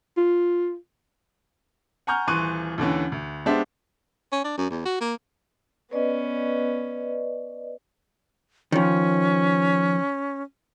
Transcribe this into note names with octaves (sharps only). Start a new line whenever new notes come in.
F4
F#5 G#5 A#5 C#6 F6 G6
D#1 E3 C6 C#6 F#6 D#7
D#2 D3 E3 C#4
D2
G#3 B3 D4 G4 C5 E5
C#4
D4
F#2
E2
F#4
A#3
B3 C#4 B4 D5 D#5
D#3 F3 C#4